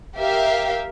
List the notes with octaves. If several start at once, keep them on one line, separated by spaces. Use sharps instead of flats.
G4 A#4 E5 F5